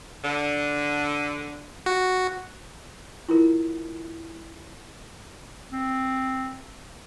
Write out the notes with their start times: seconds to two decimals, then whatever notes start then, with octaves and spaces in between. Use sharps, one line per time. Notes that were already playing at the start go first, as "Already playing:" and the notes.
0.23 D3
1.86 F#4
3.29 E4 F4 A#4
5.72 C4